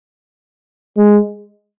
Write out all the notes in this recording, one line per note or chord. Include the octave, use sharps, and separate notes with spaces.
G#3